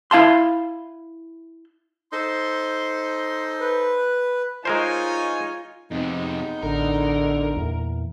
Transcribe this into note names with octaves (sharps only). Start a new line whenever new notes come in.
E4 F5 A5 C6
D#4 A4 C5 C6
B4
G#3 D#4 F4 A#4 C5 C#5 G#5
F2 C3 G#3 B3 D#4
A1 D3 A#4
E2 A#2